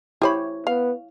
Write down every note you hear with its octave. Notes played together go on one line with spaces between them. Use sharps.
E4 G4 C5 C#5 B5
B3 F5